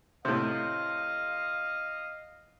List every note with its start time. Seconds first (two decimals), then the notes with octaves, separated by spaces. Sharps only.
0.25 A2 C3 D#5 F5